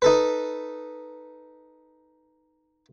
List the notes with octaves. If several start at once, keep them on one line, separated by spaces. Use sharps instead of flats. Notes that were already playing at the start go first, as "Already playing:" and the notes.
D#4 A4 B4